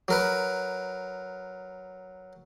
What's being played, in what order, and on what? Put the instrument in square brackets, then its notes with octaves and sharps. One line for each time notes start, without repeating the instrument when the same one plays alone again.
[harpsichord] F#3 A#4 B4